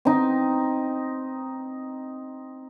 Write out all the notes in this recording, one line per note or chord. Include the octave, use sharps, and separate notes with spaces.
C4 D#4